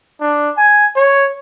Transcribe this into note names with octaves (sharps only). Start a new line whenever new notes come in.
D4
G#5
C#5